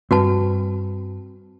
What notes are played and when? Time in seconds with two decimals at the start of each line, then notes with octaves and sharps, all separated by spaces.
0.11 G2 G3 C4 F#4 B4 A5